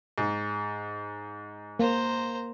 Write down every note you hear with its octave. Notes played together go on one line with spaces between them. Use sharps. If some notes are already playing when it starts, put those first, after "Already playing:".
G#2
A#3 C5 A#5